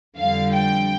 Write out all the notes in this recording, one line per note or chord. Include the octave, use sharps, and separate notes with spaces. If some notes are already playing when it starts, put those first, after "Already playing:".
F2 D3 G3 F5
G5